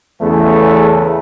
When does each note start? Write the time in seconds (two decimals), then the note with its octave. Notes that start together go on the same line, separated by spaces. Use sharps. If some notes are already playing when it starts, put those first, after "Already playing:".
0.21 E2 C#3 A3